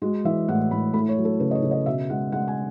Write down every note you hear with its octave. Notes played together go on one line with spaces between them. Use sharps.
G#3 F#4
E3 E5
A2 F#5
A2 B5
A3 B5
C#5
F#3
A4
C#3 B4
D#5
C#5
C#3
D#5
B2 E5
G#3 F#5
G#3 F#5
G#5